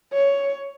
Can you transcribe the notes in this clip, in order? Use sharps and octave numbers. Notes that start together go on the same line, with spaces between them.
C#5